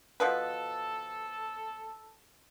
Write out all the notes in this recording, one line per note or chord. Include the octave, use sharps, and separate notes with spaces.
B2 F3 A4 B4